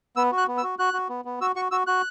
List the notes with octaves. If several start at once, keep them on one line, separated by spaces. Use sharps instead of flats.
B3 E6
F#4
F#6
B3
E6
F#4
F#4 F#6
F#4
B3
B3
F#4 E6
F#4 C#6
F#4 E6
F#4 F#6